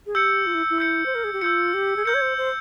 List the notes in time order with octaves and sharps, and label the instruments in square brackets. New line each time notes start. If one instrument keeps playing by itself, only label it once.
[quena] G#4
[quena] G4 [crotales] E6 G6 C#7
[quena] F4
E4
E4
[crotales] E6 G6 C#7
[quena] C5
A#4
G#4
G4
[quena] F4 [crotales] E6 G6 C#7
[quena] G4
G#4
[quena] A#4 [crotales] E6 G6 C#7
[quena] C#5
C5
C5